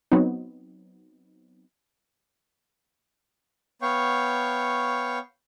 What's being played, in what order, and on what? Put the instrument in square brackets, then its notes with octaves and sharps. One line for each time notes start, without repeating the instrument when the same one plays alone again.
[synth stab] F#3 B3 C4 D#4
[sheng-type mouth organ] B3 C#5 F5 G5 C#6